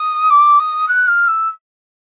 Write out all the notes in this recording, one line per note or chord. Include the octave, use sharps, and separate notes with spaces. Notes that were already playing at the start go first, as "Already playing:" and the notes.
Already playing: D#6
D6
D#6
F#6
F6
E6